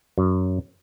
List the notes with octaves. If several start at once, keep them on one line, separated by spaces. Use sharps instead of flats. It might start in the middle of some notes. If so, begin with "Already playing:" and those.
F#2